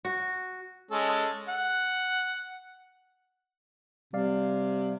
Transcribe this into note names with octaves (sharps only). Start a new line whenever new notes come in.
F#4
G#3 C#4 A4
F#5
C3 G3 D5 F5